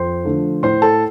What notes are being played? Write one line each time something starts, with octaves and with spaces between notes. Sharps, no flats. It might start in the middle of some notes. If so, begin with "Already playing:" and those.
Already playing: F2 C5 C6
D3 F3 A3
A2 C5 C6
A4 A5